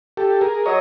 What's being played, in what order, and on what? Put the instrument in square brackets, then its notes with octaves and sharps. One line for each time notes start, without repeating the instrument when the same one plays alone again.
[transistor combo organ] G4 A4
G#4 A#4
[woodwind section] F#3 [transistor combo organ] C#5 D#5